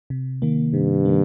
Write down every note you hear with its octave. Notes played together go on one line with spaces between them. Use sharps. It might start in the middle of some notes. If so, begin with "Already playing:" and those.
C3
D#3 A#3
G2 C3
D#3 A#3